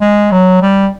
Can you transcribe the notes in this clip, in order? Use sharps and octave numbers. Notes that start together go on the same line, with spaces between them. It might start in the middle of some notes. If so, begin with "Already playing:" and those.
G#3
F#3
G3